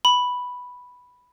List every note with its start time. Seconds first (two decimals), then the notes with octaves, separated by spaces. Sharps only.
0.05 B5